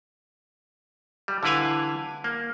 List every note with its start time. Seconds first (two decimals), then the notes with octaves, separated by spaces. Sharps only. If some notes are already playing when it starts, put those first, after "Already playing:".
1.28 G3
1.43 D3 E3 E4 B4 F5 G#5
2.24 A#3